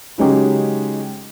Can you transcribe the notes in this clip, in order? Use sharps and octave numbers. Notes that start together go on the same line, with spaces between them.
C#3 F#3 G#3 C#4 D#4 G4